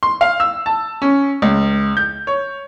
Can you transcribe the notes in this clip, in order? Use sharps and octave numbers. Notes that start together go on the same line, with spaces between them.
C6
F5
E6
A5
C#4
C#2
G6
C#5